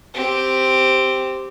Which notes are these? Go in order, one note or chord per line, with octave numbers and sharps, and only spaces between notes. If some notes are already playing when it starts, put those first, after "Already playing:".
C4 G4